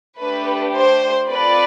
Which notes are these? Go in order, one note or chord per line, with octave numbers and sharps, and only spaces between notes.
A3 D4 G4 B4
C5
C4 F4 A4 B4 D5